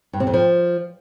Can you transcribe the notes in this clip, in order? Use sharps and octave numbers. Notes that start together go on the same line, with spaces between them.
G2
C3
F2
F3